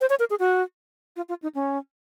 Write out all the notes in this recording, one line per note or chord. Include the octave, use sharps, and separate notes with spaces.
C5
C#5
A#4
G#4
F#4
F4
F4
D#4
C#4